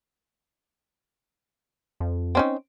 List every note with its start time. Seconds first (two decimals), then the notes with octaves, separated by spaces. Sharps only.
2.00 F2
2.35 C4 C#4 D#4